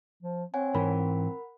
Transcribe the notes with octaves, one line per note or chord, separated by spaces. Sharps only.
F3
C4 C#5 F#5 G#5
G#2 E3 A#4 F#5 B5